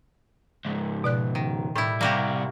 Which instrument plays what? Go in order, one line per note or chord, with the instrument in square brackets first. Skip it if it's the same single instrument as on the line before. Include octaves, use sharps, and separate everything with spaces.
[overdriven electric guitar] C#2 G#2
[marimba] B2 D5 F#6
[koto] D#3
[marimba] A2 [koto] G3 E4
[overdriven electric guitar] C3 G3 [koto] A#3 F#4 G4